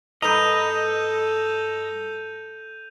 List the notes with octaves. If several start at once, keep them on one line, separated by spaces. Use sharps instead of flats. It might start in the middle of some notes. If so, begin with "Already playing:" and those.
G2 A4 B4 D#5 A#5 G6 D#7 F7